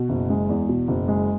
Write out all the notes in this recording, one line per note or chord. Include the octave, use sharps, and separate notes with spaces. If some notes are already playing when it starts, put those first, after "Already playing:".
Already playing: B2
F#1
G#3
E2
B2
F#1
G#3